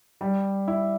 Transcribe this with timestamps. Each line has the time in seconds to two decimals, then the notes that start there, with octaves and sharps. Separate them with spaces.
0.21 G3
0.68 E4